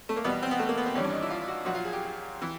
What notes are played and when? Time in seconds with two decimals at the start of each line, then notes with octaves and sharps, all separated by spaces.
0.09 A3
0.16 A#3
0.24 E2 B2 G3 B3
0.42 C4
0.51 B3
0.59 A3
0.69 A#3
0.77 B3
0.86 C4
0.95 G#1 G2 E3 G3 C#4
1.04 D4
1.12 D#4
1.22 E4
1.30 F4
1.48 F#4
1.65 A#1 A#2 F#3 F#4
1.75 F4
1.85 G#4
1.93 G4
2.42 E3